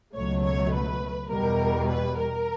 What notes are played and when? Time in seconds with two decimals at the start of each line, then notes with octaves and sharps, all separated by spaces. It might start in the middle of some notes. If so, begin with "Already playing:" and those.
0.15 C#2 B2 F#3 A3 C#5
0.43 C#5
0.73 B4
1.30 E2 B2 G3 A#4
1.89 B4
2.17 A#4